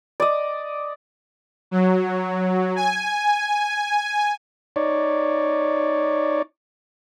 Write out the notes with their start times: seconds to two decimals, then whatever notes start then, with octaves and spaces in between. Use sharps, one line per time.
0.20 D5 D#5
1.71 F#3
2.76 G#5
4.76 D#4 C#5 D5